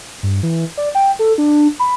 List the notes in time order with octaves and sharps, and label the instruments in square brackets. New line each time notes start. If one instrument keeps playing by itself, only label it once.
[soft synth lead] G2
E3
D5
G5
A4
D4
B5